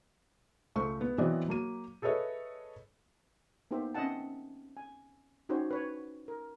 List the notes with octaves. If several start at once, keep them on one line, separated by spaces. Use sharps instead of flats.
C#2 A3 C5 C#6
B3
E3 F#3 B3 C4 D5 D#5
F#3 A#3 D#7
G#4 A4 B4 C#5 D#5 E5
A#3 B3 D#4 G4 C5 E5
C4 C#4 D#5 E5 F#5 A5
G#5
C#4 D#4 F#4 G4 C5 C#5
B4 C#5
A#4